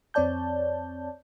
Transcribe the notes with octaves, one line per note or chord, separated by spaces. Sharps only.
F2 C4 C#5 D5 A5 G6